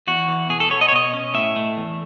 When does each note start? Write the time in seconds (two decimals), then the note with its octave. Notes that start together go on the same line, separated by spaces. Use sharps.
0.07 E2 F#4
0.28 E3
0.50 B2 G#4
0.60 A4
0.70 B3 C#5
0.81 D#5
0.88 C#5
0.92 B2 D#5
1.14 C#4
1.34 A2 E5
1.56 A3
1.77 E2